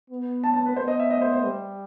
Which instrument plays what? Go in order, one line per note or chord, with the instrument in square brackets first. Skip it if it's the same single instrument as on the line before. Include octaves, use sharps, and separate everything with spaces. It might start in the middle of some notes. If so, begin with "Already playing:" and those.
[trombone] B3
[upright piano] A5
A5
B4
[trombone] B3 [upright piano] C5
[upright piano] D#5
E5
D#5
C5
C5
[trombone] G3